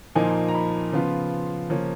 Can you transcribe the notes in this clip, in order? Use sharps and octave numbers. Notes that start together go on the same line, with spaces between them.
A#2 F3 A#3 D#4 G#5
A#5
B5
C#3 F3 B3 F4
C#3 F3 A#3 C#4